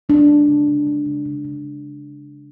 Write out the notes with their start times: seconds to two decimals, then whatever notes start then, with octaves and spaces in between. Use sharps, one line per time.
0.09 G#3 D4
0.29 G#3
0.48 C#3
0.67 C#3
0.87 G#3
1.06 C#3
1.25 C#3
1.44 C#3